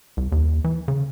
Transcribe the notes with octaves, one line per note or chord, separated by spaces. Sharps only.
C2
D#2
E3
C#3